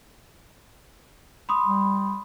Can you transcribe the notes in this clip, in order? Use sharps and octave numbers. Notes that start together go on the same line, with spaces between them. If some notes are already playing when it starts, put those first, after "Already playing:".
B5 C6 D#6
G3